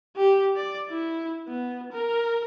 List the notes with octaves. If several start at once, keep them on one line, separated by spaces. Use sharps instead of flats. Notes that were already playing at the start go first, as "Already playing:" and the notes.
G4
D5
E4
B3
A#4